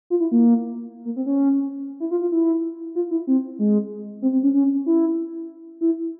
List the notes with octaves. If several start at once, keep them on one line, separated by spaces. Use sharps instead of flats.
F4
E4
A#3
A#3
C4
C#4
E4
F4
F4
E4
F4
E4
C4
G#3
C4
C4
C#4
C#4
E4
E4